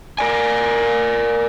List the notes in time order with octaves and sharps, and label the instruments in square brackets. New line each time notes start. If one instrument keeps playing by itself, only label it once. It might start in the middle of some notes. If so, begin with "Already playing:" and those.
[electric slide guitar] A#4 D5 G#5